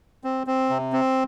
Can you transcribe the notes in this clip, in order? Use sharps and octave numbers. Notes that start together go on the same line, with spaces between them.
C4
C4
C3
C4